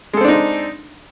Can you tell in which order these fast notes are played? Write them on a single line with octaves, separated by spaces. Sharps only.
G#3 A4 C4 D4 D#4